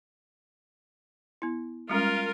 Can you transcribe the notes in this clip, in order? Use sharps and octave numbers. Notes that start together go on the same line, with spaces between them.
B3 E4
G3 G#3 C#4 F4 A#4